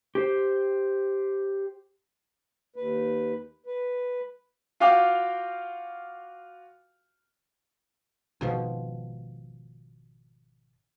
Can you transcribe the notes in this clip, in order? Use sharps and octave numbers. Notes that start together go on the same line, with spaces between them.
G4 C5
D#2 B4
B4
F4 F#4 F5 G5 D6 F6
G#1 B2 F3